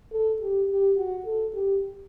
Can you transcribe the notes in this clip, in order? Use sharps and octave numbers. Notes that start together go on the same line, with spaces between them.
A4
G4
G4
F#4
A4
G4